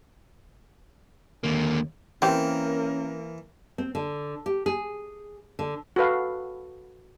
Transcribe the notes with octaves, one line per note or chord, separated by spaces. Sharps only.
D#2 D3 A#3
E3 A#3 C4 C#4 G4 A#4
C4
D3
G4
G#4
D3
F#4 A4 B4 F5